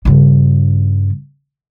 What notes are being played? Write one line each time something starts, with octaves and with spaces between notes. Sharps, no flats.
G2 C#3